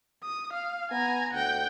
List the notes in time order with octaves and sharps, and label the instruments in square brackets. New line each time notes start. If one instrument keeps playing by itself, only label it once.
[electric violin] D#6
F5
[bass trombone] B3 [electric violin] G#5 A#5
[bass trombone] D2 [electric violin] F#5 G5